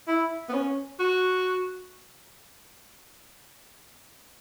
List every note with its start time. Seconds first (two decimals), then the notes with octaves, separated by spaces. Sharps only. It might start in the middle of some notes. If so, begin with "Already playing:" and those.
0.08 E4
0.49 B3
0.53 C#4
1.00 F#4